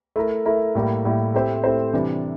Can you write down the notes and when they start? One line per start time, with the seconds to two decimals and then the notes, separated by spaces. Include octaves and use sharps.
0.16 A3 E4 A#4
0.45 A3 E4 A#4
0.75 A2 G3 A#3 E4
1.04 A2 G3 A#3 E4
1.34 A3 C4 E4 G4 C5
1.64 A3 C4 E4 G4 C5
1.93 C3 E3 G3 D4